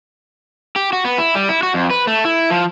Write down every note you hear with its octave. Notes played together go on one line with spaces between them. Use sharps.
G4
F#4
B3
E4
G3
E4
F#4
F2
B4
A3
E4
F3